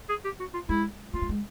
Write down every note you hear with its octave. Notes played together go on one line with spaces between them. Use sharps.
G#4
G4
F#4
F4
G#3 E4
A#3 F4
A3
G#3